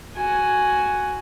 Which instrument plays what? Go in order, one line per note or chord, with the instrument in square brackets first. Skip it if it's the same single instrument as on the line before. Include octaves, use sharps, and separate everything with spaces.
[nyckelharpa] F#4 G#5